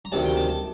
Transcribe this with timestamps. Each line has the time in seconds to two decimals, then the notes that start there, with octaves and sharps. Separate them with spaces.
0.05 A#5
0.12 D2 C3 D#3 A5
0.24 G5
0.36 A5
0.49 A5